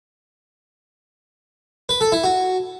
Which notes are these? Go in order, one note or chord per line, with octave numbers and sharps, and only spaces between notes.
B4
A4
E4
F#4